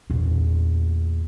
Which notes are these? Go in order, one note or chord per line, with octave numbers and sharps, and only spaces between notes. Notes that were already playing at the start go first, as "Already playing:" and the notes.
E2 A#2